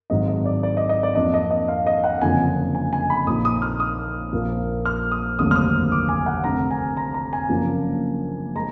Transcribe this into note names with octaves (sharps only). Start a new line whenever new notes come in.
G#1 G#2 F#3 D4 D#5
D#5
D5
D5
D#5
D#5
D5
F2 F3 A#3 D4 D#5
D#5
D#5
F5
D#5
F#5
F#1 F2 D3 F3 G#5
G#5
G#5
B5
A#1 A#2 F3 A#3 D#4 D#6
D#6
F6
D#6
A#1 A#2 F3 A#3
F6
D#6
F1 D#2 D3 F#3 D#6
F6
D#6
D6
G#5
F#5
F1 F2 D3 A#5
G#5
A#5
A#5
G#5
F#1 F#2 F3 A#3 D4
G#3 A#5